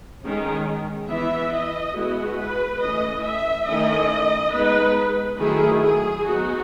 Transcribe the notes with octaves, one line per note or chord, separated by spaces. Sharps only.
D#3 G#3 C#4
E3 B3 E4 E5
D#5
G#3 B3 E4 F#4
B4
E3 A3 C#4 E4 D#5
E5
D#3 A3 C#4 E4 D#5
G#3 B3 D#4 B4
D#3 F#3 A3 E4 G#4
G#4
F#3 B3 D#4 F#4